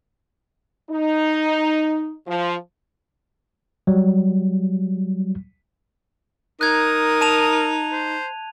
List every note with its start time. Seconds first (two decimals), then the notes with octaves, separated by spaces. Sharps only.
0.90 D#4
2.27 F3
3.87 F#3 G3
6.61 D#4 A#4 D#6 F#6 G#6
7.21 A5 D#7 F7
7.92 C5